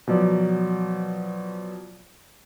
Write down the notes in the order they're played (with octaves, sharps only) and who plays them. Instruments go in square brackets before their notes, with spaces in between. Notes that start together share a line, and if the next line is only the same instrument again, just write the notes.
[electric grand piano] B2 F3 F#3 D5